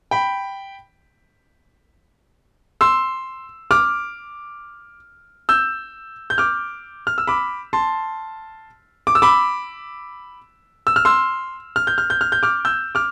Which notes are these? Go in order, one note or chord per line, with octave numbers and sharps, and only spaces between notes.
G5 B5
C6 E6
D6 F6
E6 G6
G6
D6 F6
F6
E6
B5 D6
A5 C6
D6
E6
B5 D6
E6
F6
C6 E6
F6
G6
F6
G6
F6
G6
D6 F6
E6 G6
D6 F6